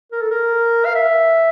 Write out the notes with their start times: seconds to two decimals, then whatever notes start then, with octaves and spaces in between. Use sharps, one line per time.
0.12 A#4
0.21 A4
0.31 A#4
0.86 F5
0.95 E5